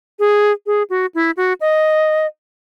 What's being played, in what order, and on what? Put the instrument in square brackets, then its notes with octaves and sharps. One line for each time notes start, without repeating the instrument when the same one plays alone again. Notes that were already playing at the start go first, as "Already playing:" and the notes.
[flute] G#4
G#4
F#4
E4
F#4
D#5